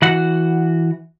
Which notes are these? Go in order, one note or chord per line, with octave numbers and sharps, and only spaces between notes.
E3 F#4 F#5